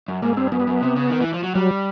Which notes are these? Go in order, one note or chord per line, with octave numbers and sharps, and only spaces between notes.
F#2
G#2 A#3
G2 C4
F#2 B3
G2
F#2
C3
C#3
D#3
E3
F3
F#3
F#3 G3